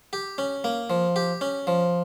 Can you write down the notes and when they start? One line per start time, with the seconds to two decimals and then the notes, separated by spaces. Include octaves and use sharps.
0.13 G4
0.38 C#4
0.64 A#3
0.90 F3
1.16 G4
1.41 C#4
1.67 F3